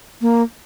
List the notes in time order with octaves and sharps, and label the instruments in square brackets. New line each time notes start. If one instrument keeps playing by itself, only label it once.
[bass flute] A#3